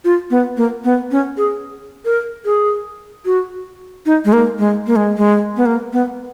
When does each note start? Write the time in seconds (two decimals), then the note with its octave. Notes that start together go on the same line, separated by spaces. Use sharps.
0.05 F4
0.30 B3
0.57 A#3
0.84 B3
1.11 C#4
1.37 G#4
2.05 A#4
2.45 G#4
3.26 F#4
4.06 D#4
4.25 G#3
4.33 A#3
4.59 G#3
4.87 A#3
4.96 G#3
5.17 G#3
5.57 B3
5.66 A#3
5.93 B3